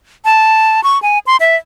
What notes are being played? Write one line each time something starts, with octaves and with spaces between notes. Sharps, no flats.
A5
C#6
G#5
C6
E5